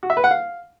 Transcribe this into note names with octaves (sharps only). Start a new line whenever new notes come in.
F#4
E5
B4
F#5
F5